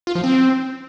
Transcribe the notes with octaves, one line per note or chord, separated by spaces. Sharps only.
F4
F3
C4